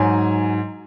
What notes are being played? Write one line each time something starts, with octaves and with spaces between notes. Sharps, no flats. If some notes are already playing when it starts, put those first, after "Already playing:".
Already playing: G#2 F#3 G#5